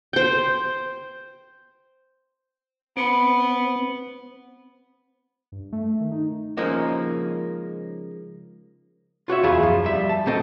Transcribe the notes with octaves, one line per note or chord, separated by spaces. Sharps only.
C5 G5
B3 C4 B5 C#7 D7
G2
A3
D#3
D#4
C#3 F3 G#3 A#3 D#4
F4 F#4 C#5 E5
E2 F4 G#4 E5 B5
F#2 F3
G3 E5
A5
B1 B2 A3 C4 A4 D#5